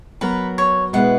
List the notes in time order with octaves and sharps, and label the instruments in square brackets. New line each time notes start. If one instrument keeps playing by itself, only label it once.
[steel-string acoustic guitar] F#3 B3 F#4 A#4 [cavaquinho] B4
[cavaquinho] C#5
[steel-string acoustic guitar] B2 G#3 B3 E4 B4 [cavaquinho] F#5